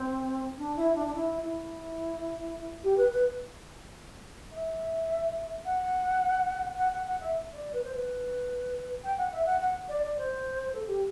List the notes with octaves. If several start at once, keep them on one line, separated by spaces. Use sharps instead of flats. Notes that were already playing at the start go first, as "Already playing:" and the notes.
Already playing: C4
D4
E4
D4
D4
E4
E4
G4
B4
B4
E5
F#5
F#5
F#5
F#5
E5
D5
B4
C5
B4
G5
F#5
E5
F#5
F#5
D5
D5
C5
A4
G4